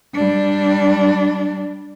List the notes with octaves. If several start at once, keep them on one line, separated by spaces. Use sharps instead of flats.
G3 D4